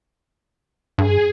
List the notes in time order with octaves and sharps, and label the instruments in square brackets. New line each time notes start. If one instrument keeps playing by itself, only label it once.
[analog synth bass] G2 [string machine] G#4